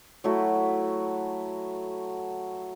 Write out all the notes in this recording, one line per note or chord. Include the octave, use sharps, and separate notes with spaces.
F#3 A3 E4 F#4